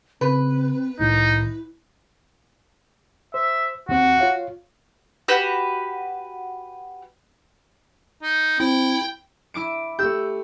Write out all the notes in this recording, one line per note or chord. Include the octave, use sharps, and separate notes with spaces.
C#3 C4 B4
C2 A2 D#3 D#4 E4
C5 E5
D#2 C4 F#4
F4 C#5 F5
F#4 G4 B4
D#4
C4 E4 G5
E4 D6 D7
A3 G4 E6 G6